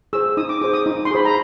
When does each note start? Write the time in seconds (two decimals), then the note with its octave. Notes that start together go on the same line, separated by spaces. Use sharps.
0.13 G#4 C5 E6
0.37 D#4 D#6
0.49 D6
0.62 G#4 C5 D6
0.74 D#6
0.86 D#4
1.05 C6
1.11 G#4 C5 B5
1.25 A#5